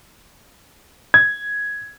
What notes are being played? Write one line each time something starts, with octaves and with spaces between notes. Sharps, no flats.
G#6